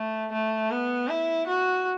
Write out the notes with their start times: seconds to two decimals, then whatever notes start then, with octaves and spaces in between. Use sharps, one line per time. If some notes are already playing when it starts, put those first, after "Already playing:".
Already playing: A3
0.32 A3
0.71 B3
1.09 E4
1.47 F#4